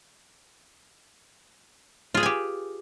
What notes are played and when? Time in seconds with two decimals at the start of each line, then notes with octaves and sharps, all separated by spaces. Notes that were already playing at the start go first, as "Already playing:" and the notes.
2.14 F4
2.17 G#4
2.20 B4
2.23 G#5
2.26 G4